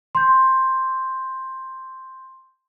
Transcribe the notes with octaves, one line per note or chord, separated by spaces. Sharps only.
C6 G6